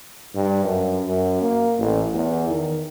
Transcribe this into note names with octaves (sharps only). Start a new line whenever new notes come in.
G2
F#2
F#2
A#3
A1
E2
D#3